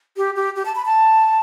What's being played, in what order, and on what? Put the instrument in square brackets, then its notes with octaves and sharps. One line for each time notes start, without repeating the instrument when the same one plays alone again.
[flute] G4
G4
G4
A5
B5
A5